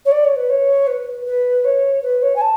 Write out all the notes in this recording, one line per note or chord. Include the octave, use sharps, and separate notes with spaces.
C#5
D5
C#5
B4
C#5
B4
B4
C#5
B4
C#5
G#5
A5